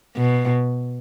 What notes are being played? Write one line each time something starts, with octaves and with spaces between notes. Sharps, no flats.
B2